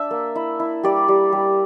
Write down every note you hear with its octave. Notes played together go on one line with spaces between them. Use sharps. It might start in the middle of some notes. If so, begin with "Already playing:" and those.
Already playing: D4 D5 E5
A#3
E4
E4
G3 D5
G3
G3